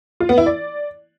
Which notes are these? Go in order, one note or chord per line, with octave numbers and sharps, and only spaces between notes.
F4
B3
E4
D5